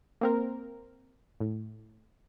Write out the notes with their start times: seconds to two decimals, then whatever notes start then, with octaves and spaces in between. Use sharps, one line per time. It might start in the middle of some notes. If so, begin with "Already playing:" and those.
0.21 A#3 C4 A#4
1.40 A2